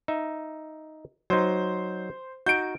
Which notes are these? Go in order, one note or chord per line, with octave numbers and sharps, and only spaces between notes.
D#4 E5
F#3 D#4 C5
D#4 F#4 G6 D7